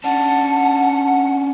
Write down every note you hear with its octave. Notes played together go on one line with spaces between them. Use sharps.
C#4 D4 F#5 A5